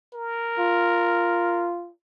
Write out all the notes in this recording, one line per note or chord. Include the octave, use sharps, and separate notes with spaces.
A#4
F4